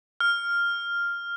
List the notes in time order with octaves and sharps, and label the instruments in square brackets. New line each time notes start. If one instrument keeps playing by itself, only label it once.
[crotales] F6